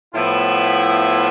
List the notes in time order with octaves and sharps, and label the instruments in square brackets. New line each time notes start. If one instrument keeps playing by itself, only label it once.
[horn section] A2 F3 B3 E4